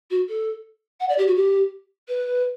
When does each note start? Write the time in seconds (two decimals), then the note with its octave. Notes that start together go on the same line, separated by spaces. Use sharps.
0.10 F#4
0.28 A4
1.00 F#5
1.09 D5
1.18 G4
1.27 F#4
1.36 G4
2.08 B4